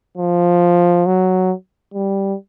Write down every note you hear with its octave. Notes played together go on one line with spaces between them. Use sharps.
F3
F#3
G3